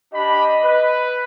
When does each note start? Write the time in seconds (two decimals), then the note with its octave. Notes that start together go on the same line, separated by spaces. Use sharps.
0.13 D4 G4 D#5 B5
0.62 B4